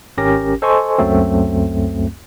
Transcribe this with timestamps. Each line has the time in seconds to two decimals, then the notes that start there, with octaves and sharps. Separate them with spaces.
0.17 G#1 C#4 G4 A#4 A#6
0.62 A4 C5 D#5 G#5 C6 C#6
0.98 C#2 F#2 F#3 A3 C4